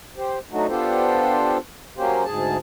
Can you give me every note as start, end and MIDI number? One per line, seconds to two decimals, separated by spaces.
0.17 0.39 67
0.17 0.39 72
0.51 0.67 54
0.51 0.67 57
0.51 0.67 62
0.51 0.67 63
0.51 0.67 66
0.69 1.58 59
0.69 1.58 62
0.69 1.58 65
0.69 1.58 67
0.69 1.58 69
0.69 1.58 72
1.97 2.24 54
1.97 2.24 58
1.97 2.24 61
1.97 2.24 67
1.97 2.24 72
2.25 2.57 38
2.25 2.57 44
2.25 2.57 68
2.25 2.57 81